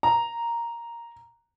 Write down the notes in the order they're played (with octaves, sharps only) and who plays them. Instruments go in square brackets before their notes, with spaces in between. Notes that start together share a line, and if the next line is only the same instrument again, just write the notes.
[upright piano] A#5